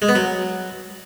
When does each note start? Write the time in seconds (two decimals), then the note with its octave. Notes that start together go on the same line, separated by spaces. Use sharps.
0.02 G#3
0.09 B3
0.15 F#3